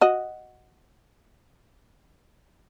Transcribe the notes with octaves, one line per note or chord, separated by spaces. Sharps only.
F#4 D#5